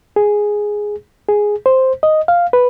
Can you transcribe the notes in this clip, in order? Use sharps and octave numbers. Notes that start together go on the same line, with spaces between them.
G#4
G#4
C5
D#5
F5
B4